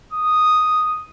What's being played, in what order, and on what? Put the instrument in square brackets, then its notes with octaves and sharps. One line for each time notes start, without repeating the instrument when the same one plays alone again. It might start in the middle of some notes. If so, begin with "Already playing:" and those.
[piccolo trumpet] D#6